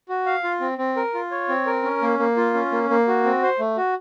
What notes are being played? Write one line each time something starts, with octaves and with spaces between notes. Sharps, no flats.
F#4
F5
F4
C4
C4
A#4
F4
C#5
C4
A#4
C#4
A#3
A#3
F4
C#4
A#3
A#3
F#4
C4
C5
A3
F#4